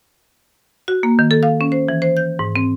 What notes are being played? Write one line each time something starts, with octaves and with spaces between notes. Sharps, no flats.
F#4
A#3
D#3
A4
F5
C#4
C5
E3
C5
G6
G#2
C4